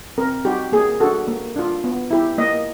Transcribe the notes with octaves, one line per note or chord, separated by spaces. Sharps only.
C4 A#4
D#4 F#4 G4
A#3 G#4
D4 F#4 A4
A#3
D4 F4
B3
E4 G4
A#3 D#5